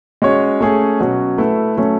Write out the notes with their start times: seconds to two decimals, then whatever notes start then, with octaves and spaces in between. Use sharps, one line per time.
0.22 G#3 C#4 F#4 C#5
0.61 A3 C#4 G#4
1.00 B2 F#3 C#4
1.38 A3 E4 B4
1.77 F#3 A3 C#4